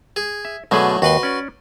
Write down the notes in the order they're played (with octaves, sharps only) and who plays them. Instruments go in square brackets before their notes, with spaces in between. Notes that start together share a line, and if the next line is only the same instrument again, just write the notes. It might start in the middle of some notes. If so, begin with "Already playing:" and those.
[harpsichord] G#4
[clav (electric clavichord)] E5
[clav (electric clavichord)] B2 G#4 B4 [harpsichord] D3 F#3 A3
[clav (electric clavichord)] D#2 [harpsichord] F#4 B4 C6
[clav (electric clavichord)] C#4 D5